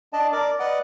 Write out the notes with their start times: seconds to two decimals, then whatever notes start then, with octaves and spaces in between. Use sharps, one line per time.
0.13 D4 D5 D#5 A5
0.33 A#4 D5 D6
0.60 B4 D5 D#5 F#5